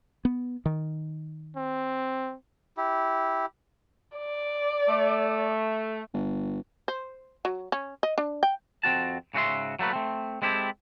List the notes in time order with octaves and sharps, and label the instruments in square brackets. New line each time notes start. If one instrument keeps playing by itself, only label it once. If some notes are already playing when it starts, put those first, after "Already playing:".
[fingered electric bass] B3
D#3
[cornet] C4
[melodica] E4 G4
[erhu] D5
[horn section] A3
[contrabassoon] G1
[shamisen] C5
F#3
C#4
D#5
D4
G5
[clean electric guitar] F2 C4 F#4 A5
G#2 C#3 F#4 G4 E5 C6
F#3 A3 A#3 B4
A3 C4
G#3 C4 E4 G4 A4